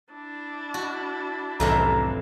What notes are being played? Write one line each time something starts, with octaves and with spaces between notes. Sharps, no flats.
D4 E4
F#4
C2 F2 A2 E3 A#5